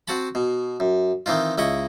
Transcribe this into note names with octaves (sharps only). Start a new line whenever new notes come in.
C4 F#4 F#5 A5 B5
B2
F#2
D#3 E3 C4 D#4 F4
C#2 E4 D#5 B5 C#6